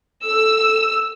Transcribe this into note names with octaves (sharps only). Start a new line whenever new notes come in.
A4 E6